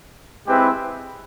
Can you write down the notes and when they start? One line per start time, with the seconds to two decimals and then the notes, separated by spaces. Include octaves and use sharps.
0.47 G#3 C4 E4 G4 B4